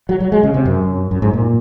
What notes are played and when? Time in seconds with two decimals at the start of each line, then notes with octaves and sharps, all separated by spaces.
0.09 F#3
0.20 F#3
0.32 G#3
0.43 C#3
0.54 C3
0.65 F#2
1.11 F#2
1.22 G#2
1.33 A#2